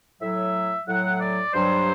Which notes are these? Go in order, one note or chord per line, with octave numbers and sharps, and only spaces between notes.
A2 F#3 E5
A2 F#3 F#5
D5
G2 F#3 C5